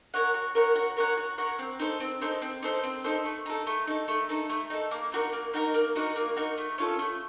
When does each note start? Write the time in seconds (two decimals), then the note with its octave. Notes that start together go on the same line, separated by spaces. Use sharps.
0.14 A#4 C#5 F#5
0.34 F#4
0.55 A#4 C#5 F#5
0.75 F#4
0.97 A#4 C#5 F#5
1.17 F#4
1.38 A#4 C#5 F#5
1.59 C4
1.79 D#4 A4 C5
2.00 C4
2.21 D#4 A4 C5
2.42 C4
2.62 D#4 A4 C5
2.83 C4
3.04 D#4 A4 C5
3.25 A3
3.46 D#4 A4
3.67 A3
3.87 D#4 A4
4.08 A3
4.29 D#4 A4
4.50 A3
4.70 D#4 A4
4.91 A#3
5.12 D#4 F#4 A#4
5.33 A#3
5.54 D#4 F#4 A#4
5.74 A#3
5.95 D#4 F#4 A#4
6.16 A#3
6.36 D#4 F#4 A#4
6.58 A3
6.78 C#4 F4 A4
6.99 A3